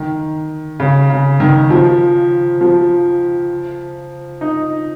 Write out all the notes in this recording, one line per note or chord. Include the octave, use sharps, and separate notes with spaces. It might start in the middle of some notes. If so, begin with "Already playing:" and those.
Already playing: D#3
C#3
C#3
D#3
F3
F3
D#4